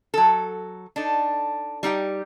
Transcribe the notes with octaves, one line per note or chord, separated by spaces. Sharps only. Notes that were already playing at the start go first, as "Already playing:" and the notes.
F#3 A4
D4 D#4 A4
G3 D#4 G4 G5